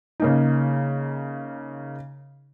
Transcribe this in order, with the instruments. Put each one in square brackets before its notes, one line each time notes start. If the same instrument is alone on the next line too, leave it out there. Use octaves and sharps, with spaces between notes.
[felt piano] C#3 A#3 D#4